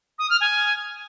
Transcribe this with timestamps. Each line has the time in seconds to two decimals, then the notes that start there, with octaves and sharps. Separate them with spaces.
0.18 D#6
0.29 F6
0.40 G#5